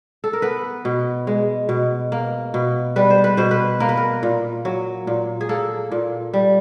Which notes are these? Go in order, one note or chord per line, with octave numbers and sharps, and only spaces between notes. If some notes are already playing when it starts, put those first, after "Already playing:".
A4
A#4
B3 B4
B2
G#3
B2
A#3
B2
G3 B4
C5
B4
B2 C5
B4
A#3 A#4
B4
A#4
A#2
F#3
A#2
G#4
A#3 A4
A#2
G3